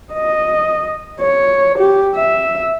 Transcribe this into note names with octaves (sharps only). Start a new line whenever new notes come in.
D#5
C#5
G4
E5